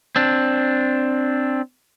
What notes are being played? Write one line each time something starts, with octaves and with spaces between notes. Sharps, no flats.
C4 D4